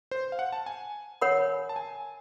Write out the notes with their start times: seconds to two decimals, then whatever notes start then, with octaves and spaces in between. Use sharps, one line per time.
0.11 C5
0.32 F5
0.39 F#5
0.52 A5
0.66 G#5
1.21 A#4 C#5 F#5 B5
1.69 A5
1.76 G#5